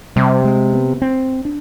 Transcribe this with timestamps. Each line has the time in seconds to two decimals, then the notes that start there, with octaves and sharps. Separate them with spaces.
0.16 C3 G3
0.45 G#3
0.73 B3
1.02 C4
1.45 D4